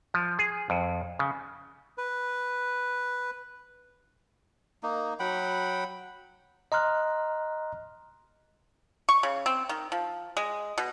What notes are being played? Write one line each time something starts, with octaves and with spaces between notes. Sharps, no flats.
F3
G#4
F2
C#3
B4
A#3 D#4
F#3 F#5 G5 B5
D#5 A#5 C6 F6 F#6
C#6
C#3
C4
D#3
F3
G#3
B2